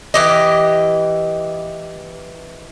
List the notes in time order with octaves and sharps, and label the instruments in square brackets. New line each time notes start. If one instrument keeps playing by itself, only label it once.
[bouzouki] E3 G4 D#5